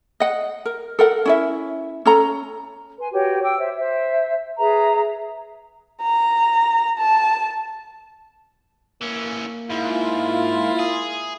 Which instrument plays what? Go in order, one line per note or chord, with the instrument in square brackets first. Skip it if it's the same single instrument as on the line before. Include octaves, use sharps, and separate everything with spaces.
[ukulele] D#5 F#5
A#4
A4 A#4 F#5
C#4 E4 E5
C#4 A4 A#5
[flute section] B4 G#5 C6
F#4 G4 B4 C#5
G5 D6 E6
C5 E5
C5 E5
G#4 B4 E5 A#5
[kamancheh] A#5
A5
[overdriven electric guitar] E3 C#4 [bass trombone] A#3
[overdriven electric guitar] G#2 [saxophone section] E4 F4
[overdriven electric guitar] G#4